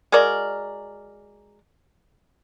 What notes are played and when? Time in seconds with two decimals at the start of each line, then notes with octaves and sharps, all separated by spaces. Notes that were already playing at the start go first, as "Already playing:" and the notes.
0.12 G#3 F#4 A#4 D5